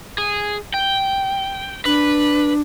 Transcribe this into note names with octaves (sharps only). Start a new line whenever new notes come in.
G#4
G5
D4 B4